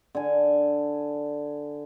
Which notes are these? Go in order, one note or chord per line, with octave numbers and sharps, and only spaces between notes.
D3 G#5